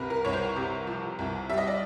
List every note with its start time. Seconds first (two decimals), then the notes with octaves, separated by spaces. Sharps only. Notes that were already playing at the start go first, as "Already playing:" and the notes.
Already playing: C2 C3 A#4 B4
0.10 A#4
0.25 C2 C#5
0.33 C5
0.56 C3
0.87 F3
1.19 C2
1.50 G3 E5
1.58 D#5
1.68 D5